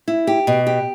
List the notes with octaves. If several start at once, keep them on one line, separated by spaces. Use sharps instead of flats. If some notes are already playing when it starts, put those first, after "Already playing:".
E4
G4
B2
G4